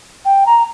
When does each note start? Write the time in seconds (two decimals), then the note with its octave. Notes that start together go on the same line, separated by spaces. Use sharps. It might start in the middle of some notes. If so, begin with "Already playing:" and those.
0.25 G5
0.46 A#5